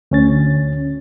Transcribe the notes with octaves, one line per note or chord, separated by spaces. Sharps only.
D2 C#4 A6